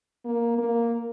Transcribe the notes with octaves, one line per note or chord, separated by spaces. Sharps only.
A#3
A#3